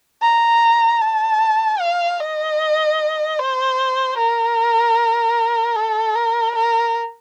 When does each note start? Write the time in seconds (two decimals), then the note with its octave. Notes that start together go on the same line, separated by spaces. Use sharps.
0.22 A#5
1.01 A5
1.80 F5
2.20 D#5
3.39 C5
4.18 A#4
5.76 A4
6.16 A#4
6.56 A#4